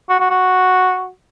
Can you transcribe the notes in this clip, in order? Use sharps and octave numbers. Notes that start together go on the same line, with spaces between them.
F#4
F#4
F#4